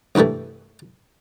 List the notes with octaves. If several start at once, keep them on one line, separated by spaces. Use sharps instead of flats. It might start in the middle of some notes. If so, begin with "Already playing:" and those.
C2 G2 E3 G3 A3